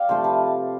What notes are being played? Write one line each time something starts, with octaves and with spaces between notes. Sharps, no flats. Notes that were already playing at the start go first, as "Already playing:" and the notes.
Already playing: D5 F5 G5
C3 F3 A3 C5
B4